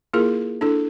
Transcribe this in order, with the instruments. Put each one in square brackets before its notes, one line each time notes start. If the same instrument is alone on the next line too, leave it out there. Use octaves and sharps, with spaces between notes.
[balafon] A#3 E4 F4 G#4 A#4
D4 E4 A4